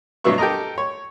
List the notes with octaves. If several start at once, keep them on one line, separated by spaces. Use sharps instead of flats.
G2 B2 F#3 B3 E5 C#6
G4 A4 A#4 D#5 A#5
C#5